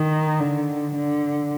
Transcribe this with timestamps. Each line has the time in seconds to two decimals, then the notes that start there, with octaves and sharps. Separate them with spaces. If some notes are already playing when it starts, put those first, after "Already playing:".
Already playing: D#3
0.40 D3
0.94 D3